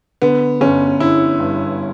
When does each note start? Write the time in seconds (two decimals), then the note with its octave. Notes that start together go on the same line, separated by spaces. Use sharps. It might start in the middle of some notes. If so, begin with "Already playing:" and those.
0.22 D3 B3
0.61 G1 C#4
1.00 D3 E4
1.40 G2